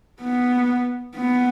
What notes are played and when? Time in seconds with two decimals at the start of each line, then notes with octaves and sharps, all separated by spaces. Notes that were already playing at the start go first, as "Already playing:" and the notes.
0.21 B3
1.16 B3